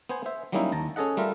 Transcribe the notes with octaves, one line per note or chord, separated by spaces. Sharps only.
B3 C5 G#5
C5 E5
F#3 G3 A#3 C#4 D#4 E4
D#2 A5 A#5
C#4 G#4 A4 D#5 F#5
G3 A3 F4 A#4 E5